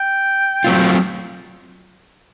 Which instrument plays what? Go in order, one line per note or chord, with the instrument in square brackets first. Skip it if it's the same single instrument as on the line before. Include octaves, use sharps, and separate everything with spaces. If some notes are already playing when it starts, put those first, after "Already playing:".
Already playing: [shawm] G5
[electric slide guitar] F#3 A3 C4 F4